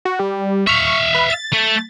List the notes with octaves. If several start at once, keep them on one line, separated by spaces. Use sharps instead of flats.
F#4
G3
E5 F5 C#6
B4
A6
A3